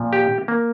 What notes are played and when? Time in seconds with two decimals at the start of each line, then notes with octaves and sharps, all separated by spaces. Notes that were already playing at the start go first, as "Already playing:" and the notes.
Already playing: A#2 F3
0.13 G4
0.48 A#3